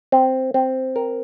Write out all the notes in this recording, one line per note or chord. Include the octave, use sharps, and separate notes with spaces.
C4
C4
A#4